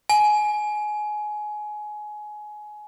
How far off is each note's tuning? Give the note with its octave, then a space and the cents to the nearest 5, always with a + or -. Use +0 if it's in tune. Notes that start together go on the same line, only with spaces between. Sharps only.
G#5 +20